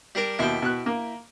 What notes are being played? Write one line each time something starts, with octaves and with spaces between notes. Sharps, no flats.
G3 D4 A#4
D#2 B2 E4 G5
B2 F#6
A#3